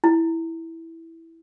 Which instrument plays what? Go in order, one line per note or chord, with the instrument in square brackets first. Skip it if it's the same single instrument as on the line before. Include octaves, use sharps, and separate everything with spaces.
[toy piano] E4